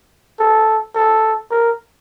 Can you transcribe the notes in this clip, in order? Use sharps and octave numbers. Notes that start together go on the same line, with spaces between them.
A4
A4
A#4